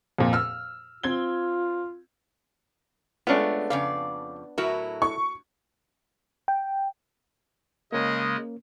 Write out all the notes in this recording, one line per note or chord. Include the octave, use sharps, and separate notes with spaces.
F2 A#2
E6 F6
C4 F4 G#6 G7
G#3 A3 B3 C#4 D4 F4
F2 C#3 C#4 D5 F5
A2 F#3 E4 F#4 A#4
C#6
G5
C#3 G#3 A#3 C#4 D#5